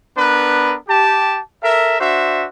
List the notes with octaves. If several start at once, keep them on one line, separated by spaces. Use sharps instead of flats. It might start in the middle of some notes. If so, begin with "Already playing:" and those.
B3 D4 A#4 B4
G4 A5
A4 A#4 E5
D4 F#4 C5 E5